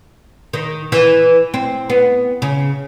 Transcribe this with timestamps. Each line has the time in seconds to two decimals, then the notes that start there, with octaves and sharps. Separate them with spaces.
0.53 D#3
0.92 E3
1.54 C4
1.90 B3
2.42 C#3